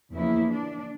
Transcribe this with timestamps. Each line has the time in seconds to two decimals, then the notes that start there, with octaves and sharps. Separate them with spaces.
0.13 E2 C#3 F3 A#3 E4
0.49 D4